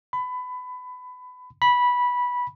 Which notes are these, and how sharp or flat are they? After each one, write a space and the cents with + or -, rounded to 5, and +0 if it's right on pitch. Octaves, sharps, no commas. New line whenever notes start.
B5 +25
B5 -10